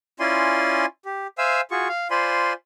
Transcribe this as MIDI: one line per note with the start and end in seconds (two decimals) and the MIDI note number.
0.20 0.86 61
0.20 0.86 64
0.20 0.86 65
0.20 0.86 74
0.20 0.86 80
0.20 0.86 84
1.05 1.27 67
1.38 1.61 72
1.38 1.61 76
1.38 1.61 77
1.38 1.61 80
1.38 1.61 88
1.71 1.88 65
1.71 1.88 66
1.71 1.88 68
1.71 1.88 85
1.88 2.08 77
2.11 2.53 65
2.11 2.53 72
2.11 2.53 74
2.11 2.53 80
2.11 2.53 83
2.11 2.53 84